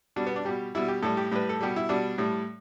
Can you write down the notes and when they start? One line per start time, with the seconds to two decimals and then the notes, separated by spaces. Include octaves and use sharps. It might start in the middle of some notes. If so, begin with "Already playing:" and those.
0.16 B2 G3 D4
0.27 B3
0.36 D4
0.45 B2 G3 G4
0.75 B2 G3 E4
0.88 G4
1.03 A2 G3 A4
1.17 G4
1.31 A2 G3 B4
1.49 A4
1.61 B2 G3 G4
1.76 E4
1.89 B2 G3 D4
2.18 A2 G3